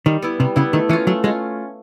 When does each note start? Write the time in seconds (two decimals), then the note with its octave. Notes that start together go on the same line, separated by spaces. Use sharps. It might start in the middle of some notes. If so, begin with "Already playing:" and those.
0.06 D#3 G3
0.22 B3 E4
0.40 C3 G3
0.56 C#3 B3 E4
0.73 D#3 A3
0.89 E3 C#4 F4
1.07 F#3 A3
1.24 G#3 C#4 F4